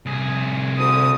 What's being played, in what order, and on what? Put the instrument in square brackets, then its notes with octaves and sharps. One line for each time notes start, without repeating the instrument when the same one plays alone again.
[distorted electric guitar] C2 G#4
[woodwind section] D2 D#6